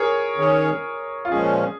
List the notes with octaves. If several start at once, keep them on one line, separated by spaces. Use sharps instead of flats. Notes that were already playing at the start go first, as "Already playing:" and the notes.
Already playing: G#4 A#4 C#5
D#3 C#4 G#4 C#5
F4
A#2 F3 G#3 C#4 G#4